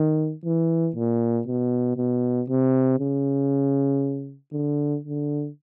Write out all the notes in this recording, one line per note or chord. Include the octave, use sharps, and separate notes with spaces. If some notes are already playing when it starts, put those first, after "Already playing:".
Already playing: D#3
E3
A#2
B2
B2
C3
C#3
D3
D3